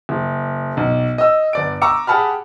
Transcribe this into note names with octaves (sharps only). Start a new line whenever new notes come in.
F#1
B1
D#5 E6
G1 D5 D7
A#5 C#6 D6 E6 C#7
G4 G#4 F#5 A5 B5 F6